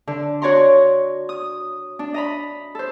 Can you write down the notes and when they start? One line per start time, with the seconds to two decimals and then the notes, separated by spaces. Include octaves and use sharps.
0.07 D3
0.42 F#4 C#5 D5 A#5 C6
1.29 D#6
1.99 D4
2.14 D#5 A#5 B5
2.75 A4 C5